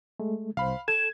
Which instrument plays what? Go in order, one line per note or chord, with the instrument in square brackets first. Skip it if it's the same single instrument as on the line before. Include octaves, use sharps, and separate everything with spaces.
[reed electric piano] G#3 A3
[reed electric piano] C2 C5 [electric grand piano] F5 B5
[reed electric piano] A4 [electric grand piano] G#6 [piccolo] E7